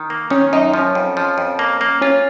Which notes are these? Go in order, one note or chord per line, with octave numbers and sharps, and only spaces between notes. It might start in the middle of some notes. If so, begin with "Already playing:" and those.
Already playing: D#3
A#3
D#3 C#4
F#2 D#4
F3 C#4
F2
F3
F2
A#3
A#3
C#4 F4